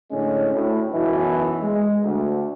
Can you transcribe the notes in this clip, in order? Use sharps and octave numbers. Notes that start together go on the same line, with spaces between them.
A2 D3 G#3 C#4
D2 A2
B1 F#2 B2 E3
G#3
D2